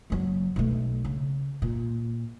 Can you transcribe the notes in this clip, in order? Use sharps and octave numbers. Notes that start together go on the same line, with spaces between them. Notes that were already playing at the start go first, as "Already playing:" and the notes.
F#1 F#3
B1 A3
C#3
A#2